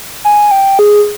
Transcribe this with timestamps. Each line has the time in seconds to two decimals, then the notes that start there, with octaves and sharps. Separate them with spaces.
0.24 G#5
0.51 G5
0.79 G#4